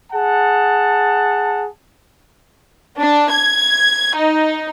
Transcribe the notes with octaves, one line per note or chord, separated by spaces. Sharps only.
G#4 F#5 A5
D4
G#6
D#4